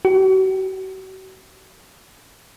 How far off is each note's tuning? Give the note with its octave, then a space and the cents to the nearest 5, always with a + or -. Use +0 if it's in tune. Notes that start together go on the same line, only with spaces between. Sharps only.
F#4 +40